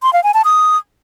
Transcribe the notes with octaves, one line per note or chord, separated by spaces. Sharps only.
C6
F5
G#5
A5
D#6